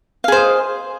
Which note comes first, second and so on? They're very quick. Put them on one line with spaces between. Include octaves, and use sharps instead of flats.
F5 G#4 C5 D#5